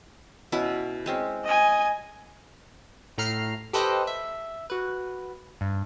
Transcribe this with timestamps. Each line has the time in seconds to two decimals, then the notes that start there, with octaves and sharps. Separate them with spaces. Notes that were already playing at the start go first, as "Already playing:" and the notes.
0.52 B2 C#4 E4
1.06 G#3 C4 C#4
1.44 D#5 G#5
3.18 A2 A3 A#5 F6 C7
3.73 G4 A4 B4 C5 D#5 G5
4.07 E5
4.70 F#4 B4
5.61 G2